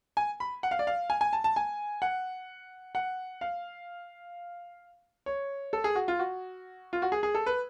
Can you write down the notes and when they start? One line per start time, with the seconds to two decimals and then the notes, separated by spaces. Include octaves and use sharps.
0.17 G#5
0.40 B5
0.63 F#5
0.71 F5
0.79 D5
0.87 F5
1.10 G#5
1.21 G#5
1.33 A5
1.44 A5
1.56 G#5
2.02 F#5
2.95 F#5
3.41 F5
5.26 C#5
5.73 A4
5.84 G#4
5.95 F#4
6.08 F4
6.19 F#4
6.93 F4
7.02 F#4
7.12 G#4
7.23 G#4
7.35 A4
7.46 B4